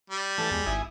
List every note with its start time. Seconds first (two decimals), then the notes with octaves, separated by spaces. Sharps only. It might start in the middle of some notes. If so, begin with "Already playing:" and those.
0.10 G3
0.38 E3 A3 A5
0.51 E2 G#3
0.66 G#1 E4 G#5 D#6